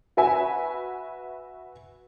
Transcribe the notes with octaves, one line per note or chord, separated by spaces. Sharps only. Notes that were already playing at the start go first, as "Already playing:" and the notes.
F#4 B4 E5 G#5